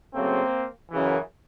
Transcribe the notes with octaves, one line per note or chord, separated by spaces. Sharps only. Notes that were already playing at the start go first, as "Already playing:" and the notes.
F#2 C#3 F#3 A3 A#3 C4
F#2 C#3 E3